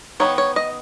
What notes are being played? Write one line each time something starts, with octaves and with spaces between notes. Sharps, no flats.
D#3 F#3 B3 D#4 C#5
C#5
D#5